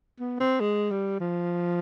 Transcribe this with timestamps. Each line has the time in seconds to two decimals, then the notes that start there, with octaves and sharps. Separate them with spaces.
0.20 B3
0.40 C4
0.60 G#3
0.91 G3
1.20 F3